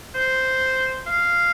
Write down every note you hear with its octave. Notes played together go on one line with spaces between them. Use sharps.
C5
F5